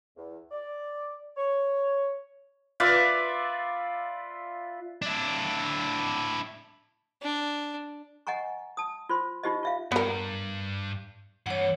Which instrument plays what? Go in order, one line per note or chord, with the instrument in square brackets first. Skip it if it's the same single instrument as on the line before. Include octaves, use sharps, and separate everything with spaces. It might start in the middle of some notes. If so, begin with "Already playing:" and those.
[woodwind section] E2
D5
C#5
[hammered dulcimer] F4 B4 D5 E5
[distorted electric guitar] D4 E4
[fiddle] D4
[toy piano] D#5 F#5 G#5 A#5 C#6
A5 D#6
F4 C5 C6
D#4 F4 G4 C5 D#5
F4 E5 F5
[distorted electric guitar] G2 [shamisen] B3 A#4
[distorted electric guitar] G2 E3 [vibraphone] C#5 F#5